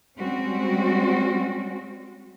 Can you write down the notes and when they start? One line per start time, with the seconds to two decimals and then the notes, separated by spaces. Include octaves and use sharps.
0.16 G3 G#3 C4 C#4 F#4